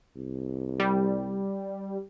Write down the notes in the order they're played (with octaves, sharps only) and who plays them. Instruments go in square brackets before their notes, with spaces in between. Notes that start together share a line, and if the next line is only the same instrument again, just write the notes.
[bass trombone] C2
[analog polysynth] G3